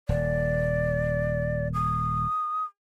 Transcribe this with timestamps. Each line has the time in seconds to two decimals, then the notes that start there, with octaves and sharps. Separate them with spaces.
0.09 D#1 D5
1.74 D#6